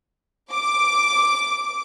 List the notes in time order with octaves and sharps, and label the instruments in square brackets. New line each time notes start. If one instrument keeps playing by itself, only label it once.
[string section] D6